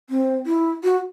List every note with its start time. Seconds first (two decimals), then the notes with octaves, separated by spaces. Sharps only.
0.10 C4
0.46 E4
0.84 F#4